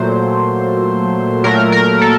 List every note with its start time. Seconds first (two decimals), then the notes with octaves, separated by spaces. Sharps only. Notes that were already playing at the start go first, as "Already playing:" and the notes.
Already playing: A#2 F#3 A3 C5
1.44 A#2 F#3 A3 A#4
1.72 A#4
2.02 A4